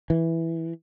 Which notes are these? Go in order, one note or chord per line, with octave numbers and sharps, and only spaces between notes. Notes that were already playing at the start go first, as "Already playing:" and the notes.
E3